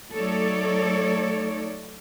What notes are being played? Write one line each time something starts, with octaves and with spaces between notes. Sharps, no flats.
F#3 A3 D#4 A4 C#5 D5